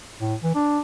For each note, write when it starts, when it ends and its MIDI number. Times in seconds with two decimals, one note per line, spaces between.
0.20 0.35 45
0.44 0.53 52
0.55 0.80 62